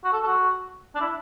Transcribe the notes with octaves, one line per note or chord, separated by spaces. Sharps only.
F#4
A4
A4
F#4
D4
E4